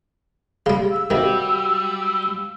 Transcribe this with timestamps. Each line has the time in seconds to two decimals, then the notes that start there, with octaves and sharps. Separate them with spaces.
0.66 C#3 G3 F5
0.91 E6
1.10 C3 D#3 G3 F#4 F5 G5